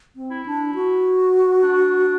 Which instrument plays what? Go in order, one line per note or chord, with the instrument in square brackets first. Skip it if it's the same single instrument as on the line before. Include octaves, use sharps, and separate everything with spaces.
[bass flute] C4
[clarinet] E4
[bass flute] D4
F#4
[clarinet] D4